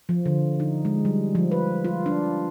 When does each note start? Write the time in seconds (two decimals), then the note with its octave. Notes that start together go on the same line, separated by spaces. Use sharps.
0.09 F3
0.26 D3
0.60 D#4
0.85 G#3
1.05 G3
1.35 F3
1.52 B4
1.84 F4
2.06 D4